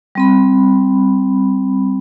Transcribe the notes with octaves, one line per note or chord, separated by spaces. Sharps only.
G3 C4 B5